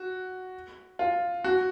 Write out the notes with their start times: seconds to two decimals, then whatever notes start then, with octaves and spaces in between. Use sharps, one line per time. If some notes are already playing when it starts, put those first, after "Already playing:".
Already playing: F#4
0.99 F4
1.44 F#4